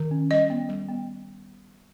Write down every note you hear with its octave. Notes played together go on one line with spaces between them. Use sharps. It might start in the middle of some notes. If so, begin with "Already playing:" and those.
Already playing: D#3
C#4
G3 D#5
B3
G3
B3